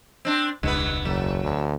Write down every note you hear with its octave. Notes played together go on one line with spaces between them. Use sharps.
C4 D4
E1 C#2 G2 B3 B4
F#1 F#3
D2